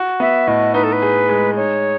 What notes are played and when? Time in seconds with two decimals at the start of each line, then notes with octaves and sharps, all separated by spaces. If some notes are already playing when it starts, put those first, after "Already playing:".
Already playing: F#4
0.20 B3 E5
0.47 A2 D#5
0.74 D#4 B4
0.84 A4
0.92 B4
1.02 G#4
1.29 G#3
1.56 D#4 C#5